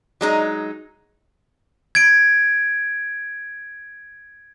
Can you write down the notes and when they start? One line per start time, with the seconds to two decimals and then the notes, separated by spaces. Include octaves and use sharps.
0.21 F#3 G#3 D#4
1.95 G#6 D7